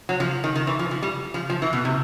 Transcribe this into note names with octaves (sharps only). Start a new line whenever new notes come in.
F#3
F3
D#3
D#3
E3
F3
F3
G3
F3
F3
E3
B2
C3